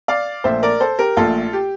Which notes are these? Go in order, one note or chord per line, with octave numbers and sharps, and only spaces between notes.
D5 F5
A#1 A#2 A3 C5 E5
A#4 D5
A4 C5
G4 A#4
A#1 A#2 A3 F4 A4
G4